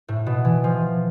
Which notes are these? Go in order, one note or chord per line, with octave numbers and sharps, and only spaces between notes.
A2
B2
E3
F3